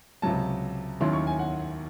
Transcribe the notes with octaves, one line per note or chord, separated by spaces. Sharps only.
C#2 C3 F#3 A5
D#2 D#3 F#3 C#4 E4 C6
C#6
G#5
F#5